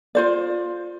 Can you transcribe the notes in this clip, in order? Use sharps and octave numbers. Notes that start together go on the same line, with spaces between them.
F4 C5 D5